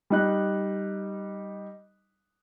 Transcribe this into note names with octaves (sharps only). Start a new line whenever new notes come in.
G3 D#4 F#6